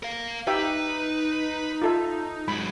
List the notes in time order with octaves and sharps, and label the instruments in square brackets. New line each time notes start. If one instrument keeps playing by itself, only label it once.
[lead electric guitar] A#4 F5
[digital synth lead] D#4 [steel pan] G4 E5 G5 [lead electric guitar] B4
[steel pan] F4 A4 E5
[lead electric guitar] G#2 F#3 [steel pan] B5